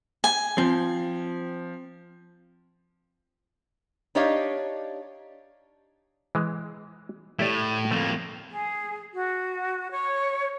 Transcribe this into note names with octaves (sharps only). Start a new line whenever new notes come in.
G#5
F3 C4
D4 D#4 G4 C#5 D#5 F5
E3 G#3
A2 E4 G4 D5
F2 A3 A#3
G#4
F#4
C#5